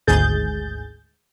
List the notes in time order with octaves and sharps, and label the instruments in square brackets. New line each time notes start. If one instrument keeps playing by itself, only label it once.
[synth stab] G#1 D2 G#2 G#4 G6 A6